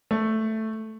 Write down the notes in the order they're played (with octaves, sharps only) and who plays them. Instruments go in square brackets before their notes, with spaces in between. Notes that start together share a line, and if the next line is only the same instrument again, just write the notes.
[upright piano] A3